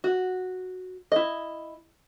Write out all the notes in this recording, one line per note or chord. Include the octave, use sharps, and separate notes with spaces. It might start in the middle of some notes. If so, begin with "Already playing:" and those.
F#4
E4 D#5